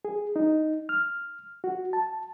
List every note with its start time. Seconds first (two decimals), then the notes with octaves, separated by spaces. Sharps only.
0.05 G#4
0.36 D#4
0.89 F6
1.64 F#4
1.93 A5